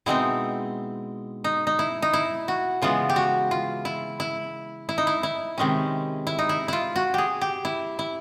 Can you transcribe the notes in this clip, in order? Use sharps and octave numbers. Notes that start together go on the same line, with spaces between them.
B2 G#3 C4 D#4 E4
D#4
D#4
E4
D#4
E4
F#4
C#3 E3 G#3 B3 F4
G4
F#4
F4
E4
E4
E4
D#4
E4
E4
C3 D#3 G#3 C#4
E4
D#4
E4
E4 F4
F#4
G4 G#4
G4
E4
E4